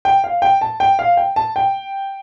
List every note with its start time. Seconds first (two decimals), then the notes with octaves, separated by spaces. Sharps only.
0.05 G5
0.24 F5
0.42 G5
0.61 A5
0.80 G5
0.99 F5
1.17 G5
1.36 A5
1.56 G5